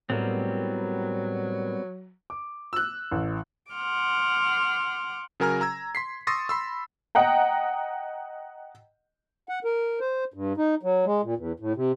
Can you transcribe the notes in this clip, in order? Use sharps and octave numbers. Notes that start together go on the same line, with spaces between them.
A2 F#3 G3 B3 C4 A#4
D6
E6 F#6
A1
F#5 C6 D6 F6
C#3 F#3 A#4 G#5 A#5 F6
A#5 E6 G#6
C6 B6 C7
C6 C#6 D#6 E6 A6 A#6
B5 C6 E6
D#5 F#5 G5 A#5
F#5
A#4
C5
G2
D#4
F#3
G#3
A#2
E2
A2
C3